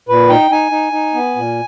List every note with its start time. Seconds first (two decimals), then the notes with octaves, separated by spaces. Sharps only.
0.08 A#2 B4
0.29 D#4 G5
0.51 D#4 G#5
0.72 D#4
0.93 D#4
1.14 B3
1.36 A#2